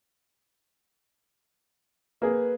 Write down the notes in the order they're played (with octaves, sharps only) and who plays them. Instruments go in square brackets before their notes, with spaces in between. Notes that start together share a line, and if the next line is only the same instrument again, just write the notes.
[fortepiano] A#3 G#4 [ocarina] B4